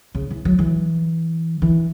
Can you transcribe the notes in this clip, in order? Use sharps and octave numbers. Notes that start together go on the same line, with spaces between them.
C#3
E3
F#3
E3
E3